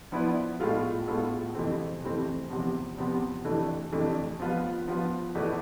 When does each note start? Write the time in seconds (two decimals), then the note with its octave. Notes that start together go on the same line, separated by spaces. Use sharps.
0.12 F3 B3 E4 B4 D5
0.60 A2 G#3 B3 F4 A4
1.08 A2 G#3 B3 F4 A4
1.55 F2 C3 E3 A3 C4
2.02 F2 C3 E3 A3 C4
2.50 E2 C3 F3 B3
2.97 E2 C3 F3 B3
3.44 F2 C3 E3 A3 D4
3.92 F2 C3 E3 A3 D4
4.40 F3 B3 F4 B4
4.88 F3 B3 F4 B4
5.35 E2 B2 A3 E4 B4